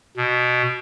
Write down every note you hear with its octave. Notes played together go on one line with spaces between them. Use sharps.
B2